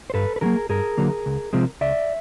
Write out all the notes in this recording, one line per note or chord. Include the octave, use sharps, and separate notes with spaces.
C5
G2 A4 B4
B4
D3 F#3 A#3 G#4 A#4
G2 G#4 A#4
D3 F#3 A#3
C#2
C3 F3 G#3 C4
C#2 D5 E5